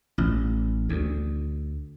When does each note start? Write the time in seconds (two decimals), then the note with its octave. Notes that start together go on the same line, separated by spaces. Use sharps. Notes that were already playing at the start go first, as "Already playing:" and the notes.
0.18 A1
0.89 D2